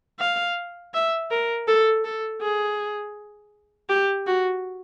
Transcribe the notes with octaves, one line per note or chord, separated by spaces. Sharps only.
F5
E5
A#4
A4
A4
G#4
G4
F#4